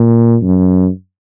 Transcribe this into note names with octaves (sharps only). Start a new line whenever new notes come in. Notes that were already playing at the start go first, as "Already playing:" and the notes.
Already playing: A#2
F#2